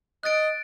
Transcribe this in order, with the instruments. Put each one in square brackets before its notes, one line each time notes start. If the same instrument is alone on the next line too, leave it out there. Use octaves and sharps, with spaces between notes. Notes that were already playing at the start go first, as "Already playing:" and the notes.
[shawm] D#5 [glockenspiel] F#6 A6 D7